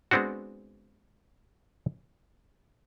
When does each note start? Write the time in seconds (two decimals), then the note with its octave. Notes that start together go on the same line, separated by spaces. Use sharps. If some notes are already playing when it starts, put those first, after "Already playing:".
0.11 G#3 B3 C4 D4 F#4